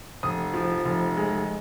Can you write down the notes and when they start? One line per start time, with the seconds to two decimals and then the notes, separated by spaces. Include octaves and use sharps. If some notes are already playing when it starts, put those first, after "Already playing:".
0.23 F1 D#6
0.54 F3
0.85 F1
1.17 G#3